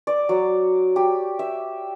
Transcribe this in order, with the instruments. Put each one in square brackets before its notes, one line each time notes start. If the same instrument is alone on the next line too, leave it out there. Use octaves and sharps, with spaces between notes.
[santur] D5
F#3
G4
E5